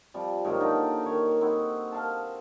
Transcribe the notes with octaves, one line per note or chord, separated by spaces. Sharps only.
C3 F3 G3
G#2 D#3 F#3 A#3
D3 D#4 G5
D#3 C#5
C4 D#4 E4 F#4
A#4 F5 A5